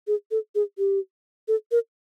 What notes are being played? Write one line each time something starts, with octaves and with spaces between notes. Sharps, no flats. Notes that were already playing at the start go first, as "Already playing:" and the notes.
G#4
A4
G#4
G4
A4
A#4